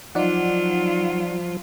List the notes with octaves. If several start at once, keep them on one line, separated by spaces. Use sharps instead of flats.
F3 F#3 D#4 F4 D5 F#5